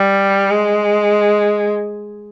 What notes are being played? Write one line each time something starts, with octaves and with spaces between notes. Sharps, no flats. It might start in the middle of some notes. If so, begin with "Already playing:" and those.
Already playing: G3
G#3